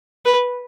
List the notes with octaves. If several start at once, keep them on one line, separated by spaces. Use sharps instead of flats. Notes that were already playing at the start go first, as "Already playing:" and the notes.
B4